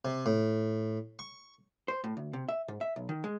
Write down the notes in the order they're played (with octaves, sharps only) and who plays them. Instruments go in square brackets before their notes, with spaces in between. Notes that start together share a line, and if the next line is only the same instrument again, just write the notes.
[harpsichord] C3
A2
C#6
[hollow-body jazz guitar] C5
A2
D2
C3
E5
G#2
E5
B1
D#3
G#3